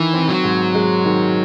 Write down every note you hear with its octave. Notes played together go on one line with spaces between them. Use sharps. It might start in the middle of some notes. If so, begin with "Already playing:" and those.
Already playing: D#3 E3
C4
F#3
G#2
G#3
D#3